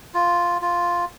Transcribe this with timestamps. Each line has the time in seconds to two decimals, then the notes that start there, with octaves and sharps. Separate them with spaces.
0.14 F4
0.62 F4